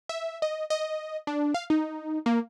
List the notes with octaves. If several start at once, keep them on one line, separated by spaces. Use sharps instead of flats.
E5
D#5
D#5
D4
F5
D#4
A#3